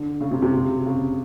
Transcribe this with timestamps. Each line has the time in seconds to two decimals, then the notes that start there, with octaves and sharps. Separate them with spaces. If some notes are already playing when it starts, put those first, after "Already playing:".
Already playing: D3
0.21 C#3
0.31 C3
0.42 C3
0.86 C#3